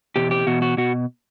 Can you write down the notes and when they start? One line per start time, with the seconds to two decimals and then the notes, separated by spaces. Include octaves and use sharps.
0.16 E2 B2 G4
0.31 G4
0.47 E2 B2 F#4
0.62 F#4
0.77 B2 F#4